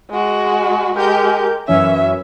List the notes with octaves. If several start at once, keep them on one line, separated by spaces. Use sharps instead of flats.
G#3 F#4
G#3 G4 A#4 G6
F#2 E3 C#4 E5